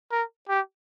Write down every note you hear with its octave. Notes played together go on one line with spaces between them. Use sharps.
A#4
G4